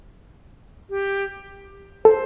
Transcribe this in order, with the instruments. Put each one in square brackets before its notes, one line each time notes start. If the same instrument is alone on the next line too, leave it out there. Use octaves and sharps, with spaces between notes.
[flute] G4
[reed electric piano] A4 [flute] C5